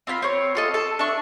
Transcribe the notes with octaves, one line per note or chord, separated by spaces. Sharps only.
C4 F4 A5 B5
C4 C#5
F4 A4 D#5
A4
D4 E5 C#6